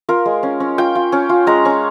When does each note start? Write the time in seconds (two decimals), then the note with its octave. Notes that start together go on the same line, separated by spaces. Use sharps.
0.09 F4 A#4
0.25 G#3
0.43 C#4
0.60 C#4
0.78 F4 G5
0.95 F4
1.12 C#4
1.29 F4
1.47 G#3 A#5
1.65 C#4